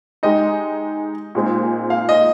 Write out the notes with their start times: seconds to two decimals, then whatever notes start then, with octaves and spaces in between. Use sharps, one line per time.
0.23 G#3 D#4 G4 D#5
1.35 A#2 G#3 C4 D#4
1.90 F5
2.09 D#5